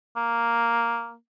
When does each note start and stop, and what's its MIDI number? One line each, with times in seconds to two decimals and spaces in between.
0.17 1.16 58